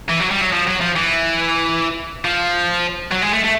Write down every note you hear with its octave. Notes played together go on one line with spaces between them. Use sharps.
E3
F#3
G3
F#3
F3
F#3
F3
E3
F3
F#3
G#3
A3
A3